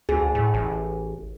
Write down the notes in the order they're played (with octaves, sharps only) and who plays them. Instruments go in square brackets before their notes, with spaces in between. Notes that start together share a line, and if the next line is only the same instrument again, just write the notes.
[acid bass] D2 [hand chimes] G#4
[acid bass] A2
A1